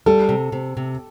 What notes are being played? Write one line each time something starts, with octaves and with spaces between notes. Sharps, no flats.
G3 A4
C3
C3
C3